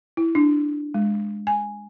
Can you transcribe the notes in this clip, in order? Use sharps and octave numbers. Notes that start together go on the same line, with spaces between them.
E4
D4
G#3
G#5